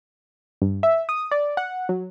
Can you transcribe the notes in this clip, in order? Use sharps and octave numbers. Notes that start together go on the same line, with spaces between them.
G2
E5
D#6
D5
F#5
F#3